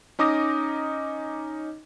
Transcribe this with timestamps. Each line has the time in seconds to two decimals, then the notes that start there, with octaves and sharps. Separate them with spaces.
0.19 C#4 D#4 D6 D#6 A#6